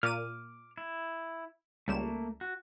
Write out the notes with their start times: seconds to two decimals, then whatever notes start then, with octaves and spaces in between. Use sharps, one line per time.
0.03 A#2 D6 F6 D#7
0.78 E4
1.88 C#2 G3 A3 A#3 E7
2.41 F#4